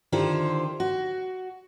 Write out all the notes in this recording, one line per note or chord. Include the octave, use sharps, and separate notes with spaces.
D3 D#3 E4 F4 G4 C5
F#4